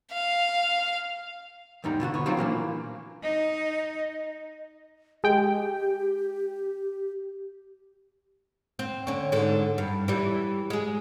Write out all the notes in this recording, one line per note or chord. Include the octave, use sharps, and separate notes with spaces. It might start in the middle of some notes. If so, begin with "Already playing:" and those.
F5
E2 G#2 G3 D#4
B2 D3 F4 F#4
B3 C#5
F#3 G3 C4 D#4 F4
A#2 E3 A#3 D4
D#4 D#5
G#3 G4 G5
C4
D3 C#4
G#2 D3
G2
E3 G3
G#3 G#4